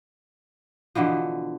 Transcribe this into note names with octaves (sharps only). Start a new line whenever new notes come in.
B2 D3 E3 F3